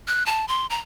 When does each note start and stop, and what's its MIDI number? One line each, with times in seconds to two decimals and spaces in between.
0.07 0.25 90
0.26 0.46 81
0.48 0.67 84
0.70 0.79 82